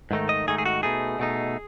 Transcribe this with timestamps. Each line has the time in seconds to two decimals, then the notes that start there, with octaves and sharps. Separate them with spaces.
0.11 G#2 D#3 A3 D#4
0.29 D#5
0.47 G#2 D#3 A3 D#4 G#4
0.58 G#4
0.66 F#4
0.83 B2 A3 D#4 G#4
1.19 B2 A3 D#4